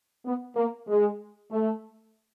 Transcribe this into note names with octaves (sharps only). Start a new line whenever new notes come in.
B3
A#3
G#3
A3